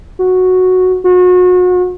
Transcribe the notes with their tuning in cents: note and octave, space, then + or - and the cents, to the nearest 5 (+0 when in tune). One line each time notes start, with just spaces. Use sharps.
F#4 -5
F#4 -35